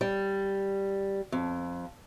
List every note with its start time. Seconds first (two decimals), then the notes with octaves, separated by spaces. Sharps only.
0.01 G3
1.32 F2